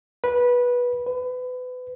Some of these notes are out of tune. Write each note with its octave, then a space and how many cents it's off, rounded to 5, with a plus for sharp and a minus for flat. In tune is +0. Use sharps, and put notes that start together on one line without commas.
B4 -15
B4 +30